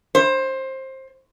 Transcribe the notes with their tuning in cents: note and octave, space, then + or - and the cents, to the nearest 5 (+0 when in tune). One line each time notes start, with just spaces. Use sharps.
C5 +20